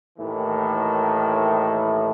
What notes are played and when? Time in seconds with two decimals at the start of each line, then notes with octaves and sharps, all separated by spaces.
0.18 D#2 A2 D#3 E3